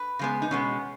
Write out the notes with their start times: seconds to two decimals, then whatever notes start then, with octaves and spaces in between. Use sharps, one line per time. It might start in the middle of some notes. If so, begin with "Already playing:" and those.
Already playing: B4
0.19 C#3 G#3 B3
0.42 D#4
0.51 B2 G#3 B3 C#4